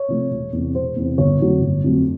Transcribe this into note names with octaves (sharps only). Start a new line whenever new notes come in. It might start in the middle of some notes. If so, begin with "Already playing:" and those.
Already playing: C#5
C3 F3 A3
E1
E2 C3
E1 C5
E2 C3
G1 C#5
F2 D3 F#3 A3
G1
F2 D3 F#3 A3